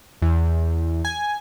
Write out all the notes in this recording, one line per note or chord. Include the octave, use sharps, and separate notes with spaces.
E2
G#5